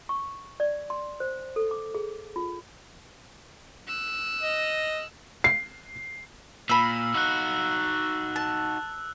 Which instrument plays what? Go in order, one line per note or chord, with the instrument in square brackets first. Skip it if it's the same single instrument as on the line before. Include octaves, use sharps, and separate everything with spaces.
[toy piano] C#6
D5
C6
C5
A4
D6
G#4
F4
[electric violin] E6 F#6
[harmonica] D#5
[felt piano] C7
[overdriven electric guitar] A#2 [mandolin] F5 B5 [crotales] E6
[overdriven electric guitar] D#4 F#4 [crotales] E6 F#6
[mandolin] A5